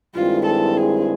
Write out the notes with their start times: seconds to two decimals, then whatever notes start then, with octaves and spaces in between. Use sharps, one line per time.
0.15 G2 D#3 G#3 C4 E4 F4
0.46 A4
0.77 G#4